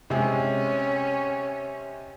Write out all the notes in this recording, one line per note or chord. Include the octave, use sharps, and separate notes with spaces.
C3 G#3 C#4